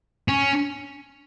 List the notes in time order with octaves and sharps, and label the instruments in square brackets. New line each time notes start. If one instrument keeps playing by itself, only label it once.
[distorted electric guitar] C#4